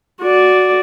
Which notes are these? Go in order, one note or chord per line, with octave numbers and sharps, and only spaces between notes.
F#4 D5